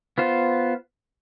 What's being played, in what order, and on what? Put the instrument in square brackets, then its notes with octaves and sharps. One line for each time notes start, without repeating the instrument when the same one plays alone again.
[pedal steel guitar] B3 F4 C5